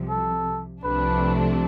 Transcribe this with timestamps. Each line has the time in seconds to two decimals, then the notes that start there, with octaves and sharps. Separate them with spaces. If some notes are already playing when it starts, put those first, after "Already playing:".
Already playing: C2 C3 F3
0.09 A4
0.83 C2 C3 F3 A3 D4 B4